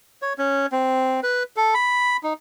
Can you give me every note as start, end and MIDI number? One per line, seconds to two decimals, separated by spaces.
0.22 0.33 73
0.38 0.66 61
0.72 1.20 60
1.23 1.43 71
1.57 1.74 69
1.74 2.17 83
2.23 2.33 63